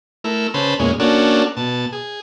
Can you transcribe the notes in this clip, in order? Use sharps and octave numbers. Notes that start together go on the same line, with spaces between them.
A3 E4 A#4
C#3 B4 C5 A5
E2 A#2 G#3 C#4
A#3 C#4 D4 F#4 A4
B2 A5
G#4